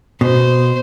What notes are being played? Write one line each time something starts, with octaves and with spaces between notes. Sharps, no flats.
B2 C5